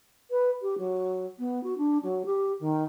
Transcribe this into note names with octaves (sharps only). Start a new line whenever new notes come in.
B4
G4
F#3
B3
F#4
D4
F#3
G4
D#3